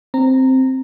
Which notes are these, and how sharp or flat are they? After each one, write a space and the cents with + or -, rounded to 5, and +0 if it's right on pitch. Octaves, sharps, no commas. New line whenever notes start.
C4 +0 A#5 -15